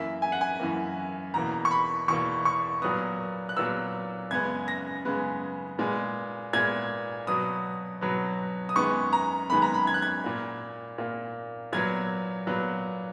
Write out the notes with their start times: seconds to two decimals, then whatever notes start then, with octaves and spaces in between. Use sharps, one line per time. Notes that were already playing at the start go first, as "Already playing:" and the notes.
Already playing: F#2 E3 A#3 E5
0.22 G#5
0.32 F#5
0.41 G#5
0.60 F#2 E3 A#3
1.34 E2 B2 A#3 A#5
1.65 C#6
1.71 B5
2.08 E2 B2 A#3 C#6
2.45 C#6
2.82 A#2 F#3 B3 D#6
3.49 F#6
3.56 A#2 F#3 B3 E6
4.31 F#2 C#3 G#3 B3 G#6
4.68 A#6
5.05 F#2 C#3 G#3 B3
5.79 A#2 G#3 B3
6.53 A#2 G#3 B3 G#6
7.27 B2 F#3 B3 D#6
8.01 B2 F#3 B3
8.69 D#6
8.76 F#2 D#3 G#3 B3 C#6
9.13 A#5
9.50 F#2 D#3 G#3 B3 B5
9.62 A#5
9.74 B5
9.87 G#6
9.94 F#6
10.02 G#6
10.24 A#2 A#3
10.98 A#2 A#3
11.72 A#2 F#3 B3 G#6
12.47 A#2 F#3 B3